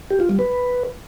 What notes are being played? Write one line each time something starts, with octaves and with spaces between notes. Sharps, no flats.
G4
F4
G3
B4